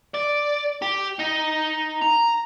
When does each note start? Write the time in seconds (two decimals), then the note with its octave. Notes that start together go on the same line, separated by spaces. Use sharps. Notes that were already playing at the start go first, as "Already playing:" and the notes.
0.14 D5
0.82 G4
1.20 D#4
2.02 A#5